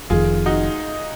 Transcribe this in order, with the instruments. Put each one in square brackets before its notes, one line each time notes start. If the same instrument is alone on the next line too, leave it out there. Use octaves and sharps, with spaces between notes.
[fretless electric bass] F1 F2 D#3 [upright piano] F4 G#4
[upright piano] D#4 F#4